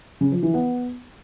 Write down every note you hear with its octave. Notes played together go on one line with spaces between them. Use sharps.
C#3
F3
E3
B3